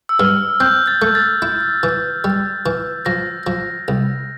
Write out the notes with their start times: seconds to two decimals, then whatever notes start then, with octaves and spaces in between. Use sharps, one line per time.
0.09 E6
0.20 G2 F6
0.60 C4 G6
0.87 A6
1.02 A3
1.15 A6
1.42 E4
1.83 E3
2.24 G3
2.66 E3
3.06 F3 A#6
3.47 F3
3.88 C2